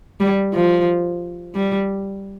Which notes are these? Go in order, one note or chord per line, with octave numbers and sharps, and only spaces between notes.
G3
F3
G3